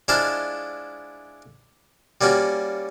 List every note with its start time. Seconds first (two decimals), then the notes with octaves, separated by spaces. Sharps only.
0.08 G#3 D4 E4 F4 C5 F5
2.21 G3 A#3 C#4 F4 F#4